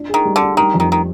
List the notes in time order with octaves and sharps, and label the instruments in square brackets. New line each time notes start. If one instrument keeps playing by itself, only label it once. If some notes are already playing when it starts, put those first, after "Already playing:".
Already playing: [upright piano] D4 F4
[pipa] D#3 [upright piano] G#4
[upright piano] G3
[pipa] D3
[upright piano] D4
[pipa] D#3 [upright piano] G3
[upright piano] F2
[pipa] D#3
D#3